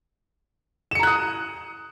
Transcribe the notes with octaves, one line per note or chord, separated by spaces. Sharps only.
A#5 D#6 F#6 C#7 E7